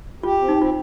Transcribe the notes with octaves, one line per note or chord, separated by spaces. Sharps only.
F4 G4
C4
D#4
C4 F4